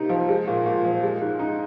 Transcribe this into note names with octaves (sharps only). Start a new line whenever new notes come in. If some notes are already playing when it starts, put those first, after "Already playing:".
Already playing: C3 A#3 D#4
F3
G#3
A#2
A#2
F3
G#3
G#2
D#4